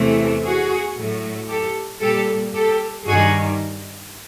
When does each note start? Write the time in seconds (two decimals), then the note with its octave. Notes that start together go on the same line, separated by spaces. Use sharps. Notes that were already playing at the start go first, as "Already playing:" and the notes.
Already playing: E2 C3 E3 A3
0.43 F#4 G#4
0.96 A2 F#3 A3
1.49 G4 A4
2.01 A#2 G3 G4 A4
2.54 G4 A4
3.06 G2 D#3 G3 F#4 G#4